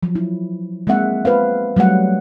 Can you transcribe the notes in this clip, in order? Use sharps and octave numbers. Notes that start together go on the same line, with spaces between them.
F3 F#3
E4
G#3 A#3 C4 E5 F#5
B4 C5 F5
F#3 G3 A3 F#5